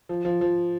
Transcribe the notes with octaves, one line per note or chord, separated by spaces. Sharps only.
F3
F3
F3